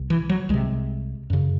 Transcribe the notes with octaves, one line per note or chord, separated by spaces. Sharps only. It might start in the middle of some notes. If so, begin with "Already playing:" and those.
Already playing: C2 C3
E3
F#3
C2 C3 G#3
F#2 C#3